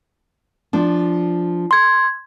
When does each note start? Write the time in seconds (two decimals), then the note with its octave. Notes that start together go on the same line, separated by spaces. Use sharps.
0.73 F3 D4
1.71 C6 G#6